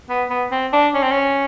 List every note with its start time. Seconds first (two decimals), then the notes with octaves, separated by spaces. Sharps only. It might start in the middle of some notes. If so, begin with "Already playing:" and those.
0.10 B3
0.30 B3
0.51 C4
0.73 D4
0.94 C#4
1.02 C4
1.11 C#4